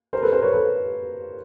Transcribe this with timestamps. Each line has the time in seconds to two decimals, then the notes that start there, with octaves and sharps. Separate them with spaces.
0.13 A#4 C5
0.23 A4 B4
0.33 A#4 C5
0.42 B4 C#5
0.52 A4 B4